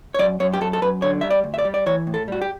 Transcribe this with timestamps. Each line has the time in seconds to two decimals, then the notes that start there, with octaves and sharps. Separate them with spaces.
0.14 C#5
0.19 F#2 D5
0.40 F#2 C#5
0.53 G4
0.61 F#2 A4
0.73 A4
0.82 F#2 B4
1.02 D3 C#5
1.21 G3 E5
1.30 D5
1.44 D2
1.54 E5
1.59 D5
1.65 G3
1.74 D5
1.86 E3 C#5
2.07 A2
2.14 A4
2.28 G3 F#4
2.42 G4